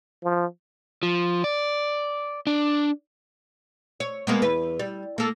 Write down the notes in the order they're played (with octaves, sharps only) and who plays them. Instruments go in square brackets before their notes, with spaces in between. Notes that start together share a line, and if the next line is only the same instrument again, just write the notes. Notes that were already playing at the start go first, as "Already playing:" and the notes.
[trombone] F3
[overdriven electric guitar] F3
D5
D4
[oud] C#5
G#3 A#3 B3
E2 B4
G3
A#3 A4